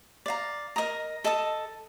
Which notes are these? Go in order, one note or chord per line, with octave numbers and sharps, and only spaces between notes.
D5 F5 A#5
A#4 D#5 A#5 D#6
A4 D#5 A5 D#6